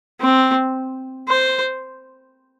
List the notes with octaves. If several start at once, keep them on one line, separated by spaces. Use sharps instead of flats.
C4
C5